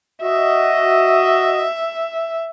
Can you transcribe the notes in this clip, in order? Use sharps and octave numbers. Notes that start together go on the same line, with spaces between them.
F#4 D#5 E5